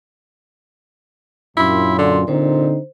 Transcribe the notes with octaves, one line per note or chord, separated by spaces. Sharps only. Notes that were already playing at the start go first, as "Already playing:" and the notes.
F#2 A#2 D4 E4 C6
D3 D5 C6
A#2 D3 C4 D#4 C5